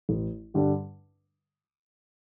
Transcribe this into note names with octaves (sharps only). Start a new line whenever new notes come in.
A1
G2 D3 G3 D4